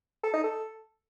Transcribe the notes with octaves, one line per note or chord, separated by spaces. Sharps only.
A4
D#4
A4